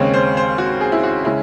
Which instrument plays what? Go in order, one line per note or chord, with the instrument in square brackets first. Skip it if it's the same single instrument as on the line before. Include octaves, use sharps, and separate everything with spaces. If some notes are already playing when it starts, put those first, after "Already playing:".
Already playing: [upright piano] D#2 C#3 G#3 C4 C#5
C5
C5
F#4
G#4
E4
F#4
C#3 G#3 C#4 E4